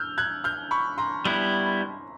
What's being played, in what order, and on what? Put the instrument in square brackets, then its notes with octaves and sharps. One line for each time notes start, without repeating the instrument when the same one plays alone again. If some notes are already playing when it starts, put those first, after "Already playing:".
Already playing: [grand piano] E6 F6 G6
F#6 G#6
F6 G6
B5 C#6
A#5 C6
[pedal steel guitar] G3 B3 E4